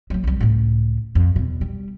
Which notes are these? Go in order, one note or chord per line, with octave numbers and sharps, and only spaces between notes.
F#3 A3
C2 G3
C#2 A2
F2
E2 B2
G3